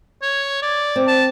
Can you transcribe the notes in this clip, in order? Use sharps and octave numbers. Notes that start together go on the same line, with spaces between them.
C#5
D5
C4
A5